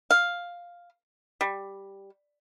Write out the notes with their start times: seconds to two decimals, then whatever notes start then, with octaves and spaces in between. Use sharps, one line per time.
0.11 F5
1.41 G3